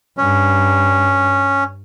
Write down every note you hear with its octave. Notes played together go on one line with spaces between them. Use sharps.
G2 C#4